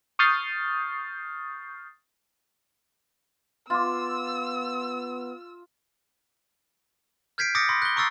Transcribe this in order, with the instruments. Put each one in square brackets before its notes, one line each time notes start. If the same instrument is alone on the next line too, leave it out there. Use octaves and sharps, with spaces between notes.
[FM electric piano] C#6 D#6 F6 G6 A6 C7
[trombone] B3 [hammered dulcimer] F4 [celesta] C6 D6 [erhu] E6
[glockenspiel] F6 G6 G#6 B6 C7 D7
D6 D#6 G6 A6 A#6 C#7
B5 C6 A#6
F#6 G7
A#5 C#6 D#6 E6 A6 C7